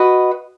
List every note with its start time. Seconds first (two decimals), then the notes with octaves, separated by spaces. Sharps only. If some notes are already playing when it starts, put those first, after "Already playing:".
Already playing: F#4 B4 D#5